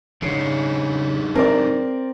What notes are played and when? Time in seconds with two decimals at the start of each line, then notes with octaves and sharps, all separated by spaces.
0.22 C#3 D4 D#4 G#4
1.35 C4 A#4 D5